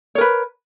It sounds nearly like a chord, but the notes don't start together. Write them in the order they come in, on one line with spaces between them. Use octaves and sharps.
C#5 A#4 B4